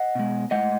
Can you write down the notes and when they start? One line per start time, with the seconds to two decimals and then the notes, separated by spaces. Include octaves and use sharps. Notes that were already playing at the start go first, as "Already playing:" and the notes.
Already playing: D#5 F#5
0.15 B2 G#3
0.51 A2 G#3 D#5 F#5